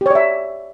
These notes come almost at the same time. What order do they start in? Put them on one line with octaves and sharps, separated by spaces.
G4 C#5 D5 E5